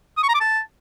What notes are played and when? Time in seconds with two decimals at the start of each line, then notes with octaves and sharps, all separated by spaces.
0.17 D#6
0.23 C#6
0.29 A#5
0.34 D6
0.40 A5